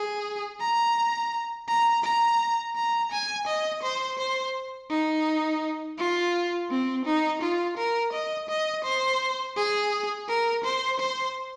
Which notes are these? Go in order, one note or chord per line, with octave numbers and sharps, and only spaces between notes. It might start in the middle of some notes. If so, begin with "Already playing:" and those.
Already playing: G#4
A#5
A#5
A#5
A#5
G#5
D#5
C5
C5
D#4
F4
C4
D#4
F4
A#4
D#5
D#5
C5
G#4
A#4
C5
C5